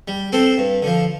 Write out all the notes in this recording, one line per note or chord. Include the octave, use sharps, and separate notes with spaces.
G3
C4 A4 C5
G2
D3 F3